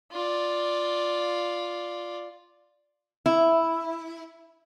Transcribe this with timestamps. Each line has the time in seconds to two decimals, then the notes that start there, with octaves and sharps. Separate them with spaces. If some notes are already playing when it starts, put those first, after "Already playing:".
0.12 F4 D5
3.26 E4